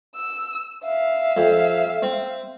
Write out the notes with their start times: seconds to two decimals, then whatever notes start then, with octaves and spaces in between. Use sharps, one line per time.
0.15 E6
0.84 E5 F5
1.37 F2
2.02 C4